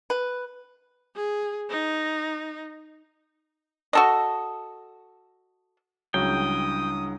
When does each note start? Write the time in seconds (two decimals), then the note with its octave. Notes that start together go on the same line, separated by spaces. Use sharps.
0.10 B4
1.16 G#4
1.70 D#4
3.93 F#4 A4 D#5
6.14 C#2 C#3 F#3 G3 D4 E4 G5 D#6